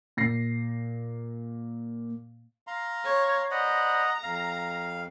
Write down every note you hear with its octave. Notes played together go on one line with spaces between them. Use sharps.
A#2 A#6 C7
F5 A#5 C6
C#5
C5 D5 D#5 F#5 A#5 B5
F2 F5